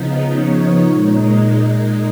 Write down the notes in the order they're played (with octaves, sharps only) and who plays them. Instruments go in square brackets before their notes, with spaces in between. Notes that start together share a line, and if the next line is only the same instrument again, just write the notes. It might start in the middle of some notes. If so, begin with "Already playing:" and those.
Already playing: [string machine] C#3 F3 B3 D#4
C#5
A#2 G#3 D#4